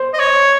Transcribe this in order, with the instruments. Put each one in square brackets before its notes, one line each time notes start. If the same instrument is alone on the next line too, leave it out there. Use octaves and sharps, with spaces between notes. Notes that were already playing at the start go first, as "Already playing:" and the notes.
Already playing: [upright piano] C5
[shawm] D#5
C#5